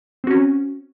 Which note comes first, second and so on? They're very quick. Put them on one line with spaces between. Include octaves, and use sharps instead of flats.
C4 F#4 C#4